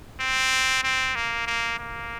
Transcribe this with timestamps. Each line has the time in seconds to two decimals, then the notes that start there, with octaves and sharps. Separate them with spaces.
0.20 C4
0.84 C4
1.15 A#3
1.47 A#3
1.79 A#3